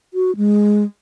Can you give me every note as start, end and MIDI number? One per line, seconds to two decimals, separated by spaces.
0.14 0.35 66
0.37 0.84 56